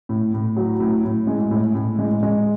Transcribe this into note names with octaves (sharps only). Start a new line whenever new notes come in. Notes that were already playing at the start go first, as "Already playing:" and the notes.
A2
A2
F#3
A2
A2
G#3
A2
A2
G#3
G#3